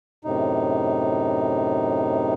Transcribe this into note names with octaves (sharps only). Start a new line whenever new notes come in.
F#2 A2 C3 D#4